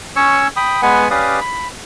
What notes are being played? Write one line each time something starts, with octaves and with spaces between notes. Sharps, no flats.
C#4 C#5 C#6 E6
G5 B5 D#6
G#3 B3 B4 F#5 G#5
C#4 G4 B4 D5 F5 D#6
B5